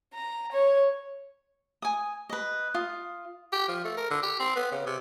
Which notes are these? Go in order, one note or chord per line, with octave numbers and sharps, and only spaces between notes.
A#5
C#5
G#5 D#6
B4 D#5
F4 D#6
G4
F3
A3
A#4
D3
G4
C4
B3
C#3
C3